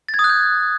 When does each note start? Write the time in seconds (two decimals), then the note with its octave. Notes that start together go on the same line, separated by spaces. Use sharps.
0.09 A6
0.14 G#6
0.19 D#6
0.24 F#6
0.29 G6